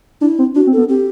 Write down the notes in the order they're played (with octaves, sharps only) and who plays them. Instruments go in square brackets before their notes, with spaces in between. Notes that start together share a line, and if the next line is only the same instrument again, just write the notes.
[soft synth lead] D4 [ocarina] E4
[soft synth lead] C4
[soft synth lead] D4 [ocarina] F#4
[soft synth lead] C4
[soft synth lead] B3 [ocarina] A4
[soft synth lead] C4 [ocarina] G4